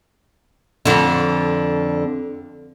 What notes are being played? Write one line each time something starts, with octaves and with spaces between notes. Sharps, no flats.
F2 D3